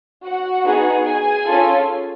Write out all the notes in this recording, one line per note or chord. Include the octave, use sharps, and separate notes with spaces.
F#4 F#5
B3 D#4 G#4
G#4 G#5
C#4 F4 A4